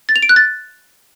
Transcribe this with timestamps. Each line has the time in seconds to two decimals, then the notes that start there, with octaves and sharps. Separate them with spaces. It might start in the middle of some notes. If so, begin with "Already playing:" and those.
0.09 A6
0.16 F7
0.22 D7
0.29 F#6
0.36 A6